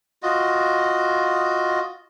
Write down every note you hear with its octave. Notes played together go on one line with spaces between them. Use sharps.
F4 F#4 D#5